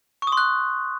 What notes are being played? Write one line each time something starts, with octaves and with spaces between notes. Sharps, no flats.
C#6
D#6
C6
F#6